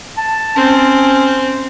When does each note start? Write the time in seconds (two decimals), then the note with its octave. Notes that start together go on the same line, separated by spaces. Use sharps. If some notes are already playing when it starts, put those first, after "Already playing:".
0.17 A5
0.56 C4 C#4